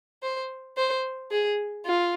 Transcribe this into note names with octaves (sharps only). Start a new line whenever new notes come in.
C5
C5
G#4
F4